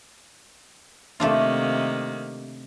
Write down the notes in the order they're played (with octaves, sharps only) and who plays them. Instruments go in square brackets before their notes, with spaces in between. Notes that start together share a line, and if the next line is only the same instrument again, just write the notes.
[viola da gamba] C3 D#3 A#3 [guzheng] A3 D4 F4